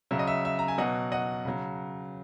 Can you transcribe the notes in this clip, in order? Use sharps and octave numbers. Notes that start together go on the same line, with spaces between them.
C#3 F#3 E5
D#5
E5
E5
A#5
G#5
B2 F#3 D#5 F#5
D#5 F#5
C#3 F#3